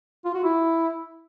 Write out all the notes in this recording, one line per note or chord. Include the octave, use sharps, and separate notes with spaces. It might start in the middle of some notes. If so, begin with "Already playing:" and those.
F4
F#4
E4